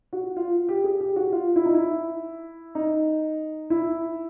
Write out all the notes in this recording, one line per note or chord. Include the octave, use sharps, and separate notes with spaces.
F#4
F4
G4
G#4
G4
F#4
F4
E4
D#4
E4
D#4
E4